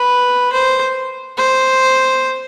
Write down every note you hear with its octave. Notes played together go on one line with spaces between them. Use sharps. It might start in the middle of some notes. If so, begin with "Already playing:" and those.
Already playing: B4
C5
C5